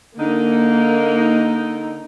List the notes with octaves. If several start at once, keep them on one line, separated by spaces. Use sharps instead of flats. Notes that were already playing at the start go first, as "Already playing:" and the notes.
D3 A#3 D#4